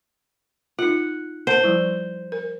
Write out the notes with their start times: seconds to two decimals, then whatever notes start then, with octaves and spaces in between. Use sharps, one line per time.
0.79 D#4 F4 F#5
1.47 C5 F#5 A5
1.64 F3 G3 E4
2.32 A#4